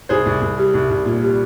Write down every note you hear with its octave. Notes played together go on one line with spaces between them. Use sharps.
C2 G#4 C5
C2
C2
G3
C2
C2
A#2
G3